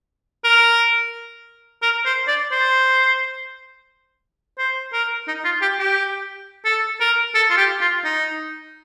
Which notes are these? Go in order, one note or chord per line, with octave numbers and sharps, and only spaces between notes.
A#4
A#4
C5
D5
C5
C5
A#4
D#4
F4
G4
G4
A4
A#4
A4
F4
G4
F4
D#4